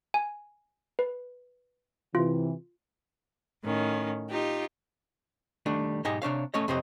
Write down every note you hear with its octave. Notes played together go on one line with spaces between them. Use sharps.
G#5
B4
C3 E3 F4
A2 D#3 C#4
D#4 F4 G4
D#3 G3 A3 D4
B1 G#2 D#4 G4 D#5 G#5
C3 D4 C#5 F5
A3 C#4 C#5 D#5
F2 C3 C4 G4 C#5 D#5